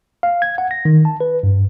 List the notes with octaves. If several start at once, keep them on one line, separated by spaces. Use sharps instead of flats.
F5
G#6
F#5
A#6
D#3
A5
B4
G2